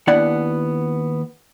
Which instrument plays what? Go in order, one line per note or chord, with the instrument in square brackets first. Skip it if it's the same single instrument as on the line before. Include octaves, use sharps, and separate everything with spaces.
[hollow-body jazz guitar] D#2 B3 D4 E4 D5 F#5